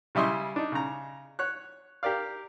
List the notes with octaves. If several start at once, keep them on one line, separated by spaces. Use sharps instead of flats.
C#3 G3 E4 D#5 C6 C#6
D4 D#4
C#3 A#5
C#5 F#6
G4 A#4 D5 F5